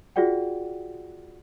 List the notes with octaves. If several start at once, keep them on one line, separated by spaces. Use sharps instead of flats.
F4 F#4 G#4 D5 F#5 G5